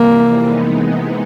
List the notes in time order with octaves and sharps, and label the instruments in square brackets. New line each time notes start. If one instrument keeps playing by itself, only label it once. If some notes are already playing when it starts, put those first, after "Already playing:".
Already playing: [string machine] F2 C3 E3 G3 [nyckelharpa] A#3
[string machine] C3 E3 G#3 B3 D#4